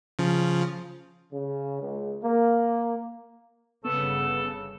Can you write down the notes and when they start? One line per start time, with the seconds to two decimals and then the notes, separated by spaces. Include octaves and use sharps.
0.19 C#3 F3
1.32 C#3
1.81 C#2
2.24 A#3
3.85 G1 C#3 B3 A4